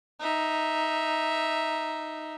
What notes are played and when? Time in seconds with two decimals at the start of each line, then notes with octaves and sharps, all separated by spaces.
0.20 D#4 E5